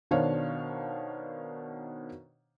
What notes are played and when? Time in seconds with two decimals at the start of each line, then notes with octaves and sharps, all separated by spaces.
0.11 B2 D#3 D4 C5 C#5 F5